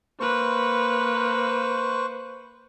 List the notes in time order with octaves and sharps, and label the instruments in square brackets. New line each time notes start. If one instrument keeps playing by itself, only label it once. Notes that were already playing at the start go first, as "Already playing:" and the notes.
[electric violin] A#3 B4 [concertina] C5 C#6